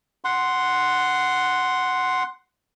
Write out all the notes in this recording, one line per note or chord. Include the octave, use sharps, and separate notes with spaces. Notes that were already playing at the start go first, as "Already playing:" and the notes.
F#5 C6